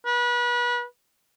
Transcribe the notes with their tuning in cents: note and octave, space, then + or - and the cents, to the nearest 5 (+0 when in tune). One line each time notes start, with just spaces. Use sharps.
B4 -30